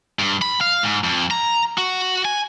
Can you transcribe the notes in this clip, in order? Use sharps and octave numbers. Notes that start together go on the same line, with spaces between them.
G2
B5
F5
G#2
F2
A#5
F#4
G#5